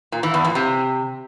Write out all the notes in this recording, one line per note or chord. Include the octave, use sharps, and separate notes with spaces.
A#2
E3
E2
A#2
C3